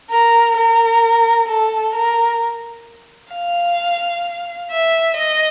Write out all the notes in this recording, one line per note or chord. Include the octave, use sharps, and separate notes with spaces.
A#4
A#4
A4
A#4
F5
E5
D#5